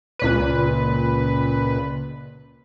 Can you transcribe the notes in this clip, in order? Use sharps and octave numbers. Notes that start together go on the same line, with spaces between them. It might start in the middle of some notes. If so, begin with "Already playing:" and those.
C#2 A#2 B4